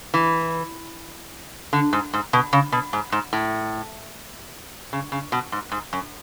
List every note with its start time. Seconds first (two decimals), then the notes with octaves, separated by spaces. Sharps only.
0.14 E3
1.73 D3
1.93 G#2
2.13 G#2
2.33 B2
2.53 C#3
2.72 B2
2.93 G#2
3.12 G#2
3.33 A2
4.93 C#3
5.12 C#3
5.32 B2
5.52 G#2
5.72 G#2
5.93 F#2